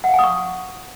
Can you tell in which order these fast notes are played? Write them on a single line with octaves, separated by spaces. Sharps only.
F#5 F5 G#5 D#6 C#6